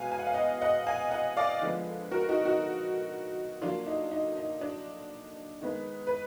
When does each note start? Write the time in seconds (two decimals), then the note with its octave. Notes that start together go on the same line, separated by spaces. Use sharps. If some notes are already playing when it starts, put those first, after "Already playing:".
Already playing: B2 G#3 B3 F5 G#5
0.12 G#5
0.19 F#5
0.27 F5
0.34 D#5 F#5
0.62 D#5 F#5
0.87 F5 G#5
1.11 D#5 F#5
1.37 D5 F5
1.62 D3 F3 G#3 B3
2.11 F#4 A#4
2.29 D#4 F#4
2.45 D#4 F#4
3.62 D3 F#3 A#3 D4 F4
3.86 D#4
4.11 D#4
4.37 D#4
4.61 D4
5.61 D#3 G#3 B3
6.07 B4